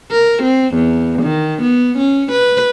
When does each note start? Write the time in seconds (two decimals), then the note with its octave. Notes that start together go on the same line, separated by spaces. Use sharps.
0.11 A#4
0.42 C4
0.74 E2
1.22 D#3
1.62 B3
1.98 C#4
2.32 B4